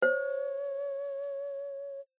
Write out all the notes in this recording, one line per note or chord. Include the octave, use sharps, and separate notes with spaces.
C5 C#5